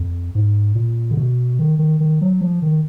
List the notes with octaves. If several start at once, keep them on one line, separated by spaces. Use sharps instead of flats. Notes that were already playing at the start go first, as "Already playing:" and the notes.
Already playing: F2
G#2
A#2
D3
B2
D#3
D#3
D#3
F#3
F3
D#3